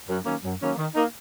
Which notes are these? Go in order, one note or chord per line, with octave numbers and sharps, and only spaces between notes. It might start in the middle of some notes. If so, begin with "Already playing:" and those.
F#2
D#3 F#3 A#3 C#4
F#2
D#3 F#3 A#3 C#4
D#3
A#3 D#4